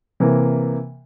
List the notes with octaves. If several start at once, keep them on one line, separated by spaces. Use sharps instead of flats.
C3 E3 A#3